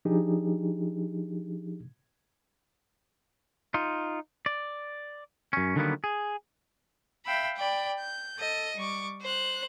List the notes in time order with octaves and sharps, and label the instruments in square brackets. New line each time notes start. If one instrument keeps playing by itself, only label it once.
[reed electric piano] F3 D4 D#4 G4 G#4
[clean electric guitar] D#4 F4
D5
F#2 C#4
D3 D#3 F#3 G3 A#3 B3
G#4
[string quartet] E5 F5 G5 B5 E6
D5 G5 B5
G6
A4 D#5
G3 C#6 D6
C5 F#6